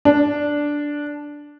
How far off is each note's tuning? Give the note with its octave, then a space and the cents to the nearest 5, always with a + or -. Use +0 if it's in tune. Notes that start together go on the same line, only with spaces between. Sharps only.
D4 -5